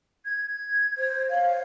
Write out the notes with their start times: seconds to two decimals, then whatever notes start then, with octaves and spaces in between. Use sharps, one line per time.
0.25 G#6
0.98 C5
1.30 C#5 F5